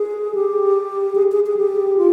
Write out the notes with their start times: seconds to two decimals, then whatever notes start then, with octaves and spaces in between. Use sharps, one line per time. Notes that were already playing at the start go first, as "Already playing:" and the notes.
Already playing: G#4
0.35 G4
1.15 G#4
1.32 G#4
1.46 G#4
1.57 G4
1.98 F4